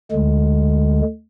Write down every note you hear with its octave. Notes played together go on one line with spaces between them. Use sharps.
D2 D3 G#3